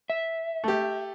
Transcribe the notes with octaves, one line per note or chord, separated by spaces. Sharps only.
E5
A3 G4